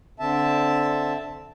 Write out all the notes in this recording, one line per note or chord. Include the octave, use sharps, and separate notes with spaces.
D3 C4 E5 A5